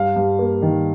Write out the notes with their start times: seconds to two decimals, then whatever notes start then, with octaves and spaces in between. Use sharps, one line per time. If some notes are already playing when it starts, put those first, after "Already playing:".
Already playing: G2 F5
0.16 G2
0.39 A#3
0.62 D#3